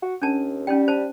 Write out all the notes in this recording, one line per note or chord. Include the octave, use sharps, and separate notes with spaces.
F#4
D#2 C#4 D4 A5
G3 C#4 D#4 G5
C5 A5